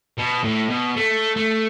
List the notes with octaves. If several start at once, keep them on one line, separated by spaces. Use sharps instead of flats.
B2
A2
B2
A3
A3